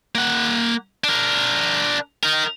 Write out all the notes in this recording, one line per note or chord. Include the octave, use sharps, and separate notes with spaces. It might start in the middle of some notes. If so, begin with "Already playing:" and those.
A#3 F#5
D4 A#4
D#4 A#4